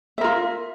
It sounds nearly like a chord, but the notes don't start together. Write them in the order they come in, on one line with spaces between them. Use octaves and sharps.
E5 A#4 F4